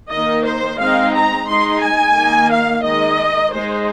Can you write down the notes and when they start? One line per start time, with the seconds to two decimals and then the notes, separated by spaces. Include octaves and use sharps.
0.10 D#3 A#3 D#4 D#5
0.44 C5
0.79 G#3 C4 D#4 F5
1.13 A#5
1.47 G#3 D#4 C6
1.82 G#5
2.15 D#3 A#3 D#4
2.50 F5
2.83 D#3 G#3 D#4 D#5
3.52 G#3 D#4 C5